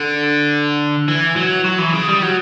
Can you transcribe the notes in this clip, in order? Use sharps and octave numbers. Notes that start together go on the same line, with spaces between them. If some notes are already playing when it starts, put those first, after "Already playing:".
Already playing: D3
E3
F#3
F#3
E3
C#3
G3
F#3